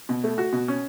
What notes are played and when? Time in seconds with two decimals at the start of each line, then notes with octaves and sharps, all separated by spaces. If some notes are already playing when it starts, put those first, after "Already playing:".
0.09 B2
0.24 A3
0.38 F#4
0.53 B2
0.68 C#4